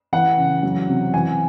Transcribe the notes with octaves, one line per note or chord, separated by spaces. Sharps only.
E3 F#5
C#3
F#3
C3
E3 G#5